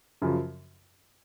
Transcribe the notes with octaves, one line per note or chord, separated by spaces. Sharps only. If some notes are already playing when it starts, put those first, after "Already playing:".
F#2 C#3 F3